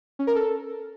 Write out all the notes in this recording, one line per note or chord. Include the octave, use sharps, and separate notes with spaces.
C#4
A#4
A4